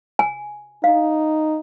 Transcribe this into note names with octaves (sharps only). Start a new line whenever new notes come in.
G#5
D#4 F5